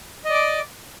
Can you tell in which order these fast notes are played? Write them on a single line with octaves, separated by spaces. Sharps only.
D#5 D5 D6